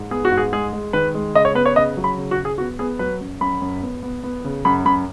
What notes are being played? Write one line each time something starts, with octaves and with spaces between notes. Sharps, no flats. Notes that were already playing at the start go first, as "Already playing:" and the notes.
Already playing: G#2
B3 G#4
F#4
G#2
G#4
G#3 G#4
G#3
D#3 B4
G#3
C#3 D#5
C#5
B3 B4
C#5
C#3 D#5
F#3
B5
C#3
F#4
C#3
G#4
B3 F#4
B3 G#4
F#3 B4
F#2
F#2 B5
F#2
B3
B3
B3
C#3
F#2 B5
F#2 B5